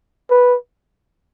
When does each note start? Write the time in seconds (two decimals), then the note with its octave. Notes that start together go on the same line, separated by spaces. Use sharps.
0.30 B4